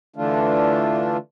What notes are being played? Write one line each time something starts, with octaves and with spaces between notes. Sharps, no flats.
D3 E3 A3 D4 F4